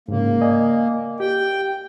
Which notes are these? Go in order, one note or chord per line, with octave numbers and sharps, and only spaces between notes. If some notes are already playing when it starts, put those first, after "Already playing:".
G#2 C#3 A#3
D5 D#5 G#5
G4 G5